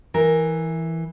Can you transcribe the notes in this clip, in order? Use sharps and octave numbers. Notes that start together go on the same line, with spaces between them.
E3 A#4